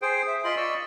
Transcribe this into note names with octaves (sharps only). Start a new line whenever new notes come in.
G#4 C5 G5
E5
F4 D#5 B5 C6
D5 D#5 C#6 E6